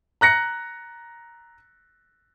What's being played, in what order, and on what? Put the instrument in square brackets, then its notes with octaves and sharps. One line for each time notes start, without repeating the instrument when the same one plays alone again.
[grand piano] A#5 F#6 A#6 C#7